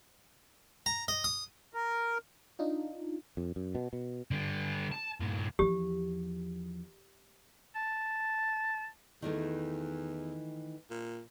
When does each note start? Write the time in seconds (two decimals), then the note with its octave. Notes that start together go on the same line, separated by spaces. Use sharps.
0.86 A#5
1.08 D#5
1.24 D#6
1.74 A#4
2.59 D4 D#4 F4
3.37 F2
3.56 F#2
3.75 B2
3.93 B2
4.31 D3 G3
4.92 A5
5.20 G2 A#2
5.59 E2 F3 G4
7.75 A5
9.22 E2 D#3 E3 A3
10.90 A#2